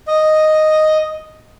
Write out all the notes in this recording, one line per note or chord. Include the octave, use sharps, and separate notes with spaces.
D#5